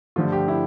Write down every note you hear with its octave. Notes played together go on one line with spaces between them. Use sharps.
G2 D3 F3 A3 F4
G4
E4